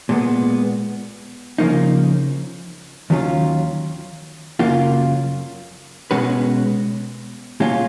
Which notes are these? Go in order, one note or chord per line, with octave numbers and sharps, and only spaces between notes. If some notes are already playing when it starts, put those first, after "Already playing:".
A#2 G#3 B3
C#3 F3 A#3 D#4
D#2 D#3 F#3 C#4 F4
F#2 C#3 F#3 A#3 F4
B2 G#3 C#4 F#4 B4
A#2 G#3 C#4 F4